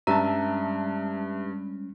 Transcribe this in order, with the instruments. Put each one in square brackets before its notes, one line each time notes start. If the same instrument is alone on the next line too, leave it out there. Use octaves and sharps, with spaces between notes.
[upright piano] G2 [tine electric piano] G3 G#3 C#4 [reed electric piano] E5 A5 [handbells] A#5